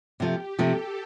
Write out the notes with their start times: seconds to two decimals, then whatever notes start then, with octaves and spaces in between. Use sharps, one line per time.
0.20 C3 F3 A3 G4
0.58 C3 F3 A3 A4